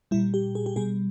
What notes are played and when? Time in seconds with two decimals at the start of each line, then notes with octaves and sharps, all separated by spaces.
0.11 A#2 G3 E4
0.34 G4
0.55 G#4
0.66 G4
0.76 B2 G3 G#4